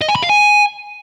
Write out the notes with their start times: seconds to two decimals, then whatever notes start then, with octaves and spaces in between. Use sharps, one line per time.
0.01 D#5
0.08 G#5
0.16 B5
0.23 F5
0.30 G#5